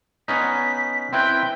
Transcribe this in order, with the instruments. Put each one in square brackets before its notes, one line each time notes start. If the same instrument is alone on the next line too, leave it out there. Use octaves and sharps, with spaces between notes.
[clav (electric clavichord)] B3 C#4 D#4 [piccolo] B6
[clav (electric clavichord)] C4 E4 B4 [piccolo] G5